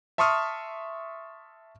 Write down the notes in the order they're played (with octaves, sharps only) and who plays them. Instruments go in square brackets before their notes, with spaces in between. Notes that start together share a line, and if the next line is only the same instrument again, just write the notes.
[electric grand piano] E5 A5 C6 C#6 D#6 F6